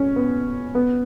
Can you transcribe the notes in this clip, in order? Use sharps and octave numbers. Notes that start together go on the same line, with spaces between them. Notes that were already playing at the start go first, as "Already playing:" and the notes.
Already playing: C#4
B3
B3